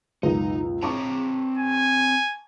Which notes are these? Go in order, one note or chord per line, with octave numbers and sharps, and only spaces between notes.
C#2 F#2 B2 D#4
C4 C#5 A5 A#5 C#6 D6
G#5